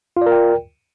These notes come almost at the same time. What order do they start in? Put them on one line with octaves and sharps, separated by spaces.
F4 D5 A#4 G5